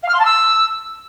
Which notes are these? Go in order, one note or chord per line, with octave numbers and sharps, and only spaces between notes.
F5
F6
C6
A5
E6